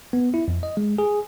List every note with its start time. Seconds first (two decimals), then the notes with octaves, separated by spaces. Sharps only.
0.13 B3
0.34 E4
0.48 F2
0.63 D#5
0.77 G#3
0.98 G#4